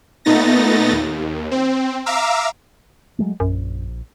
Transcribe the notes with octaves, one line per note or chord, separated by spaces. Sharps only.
A#2 A3 B3 D#4 A6 A#6
D#2
C4
E5 F5 A#5 D6 E6
F#3 G#3 A3
A#1 F#2